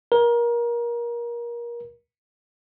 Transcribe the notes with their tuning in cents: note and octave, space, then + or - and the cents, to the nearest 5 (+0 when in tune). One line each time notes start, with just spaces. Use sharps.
A#4 +25